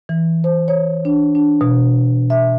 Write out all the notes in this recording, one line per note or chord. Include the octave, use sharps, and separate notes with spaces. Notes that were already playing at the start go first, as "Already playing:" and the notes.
E3
C5
C#5
D4
D4
B2
E5